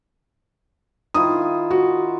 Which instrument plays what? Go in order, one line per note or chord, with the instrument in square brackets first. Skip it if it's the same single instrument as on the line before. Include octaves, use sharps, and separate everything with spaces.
[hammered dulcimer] D#3 E4 F4 [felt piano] D#6
[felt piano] F#4